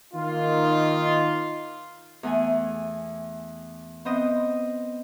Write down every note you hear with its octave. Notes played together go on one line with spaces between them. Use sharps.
D#3 A#3 D#4 F4
E2 A3 G#5
B3 C4 C5 D#5